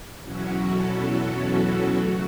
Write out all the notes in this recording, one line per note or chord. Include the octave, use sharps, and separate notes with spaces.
E2 B2 F#3 C#4 E4 F#4
A4
C#3 F#3 A3 F#4